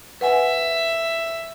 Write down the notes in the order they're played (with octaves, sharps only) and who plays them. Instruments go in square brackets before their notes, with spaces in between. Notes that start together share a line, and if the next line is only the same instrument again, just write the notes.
[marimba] B4 F#5 G#5 [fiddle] E5